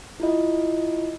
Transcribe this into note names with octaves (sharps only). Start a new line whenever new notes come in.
E4 F4 D#5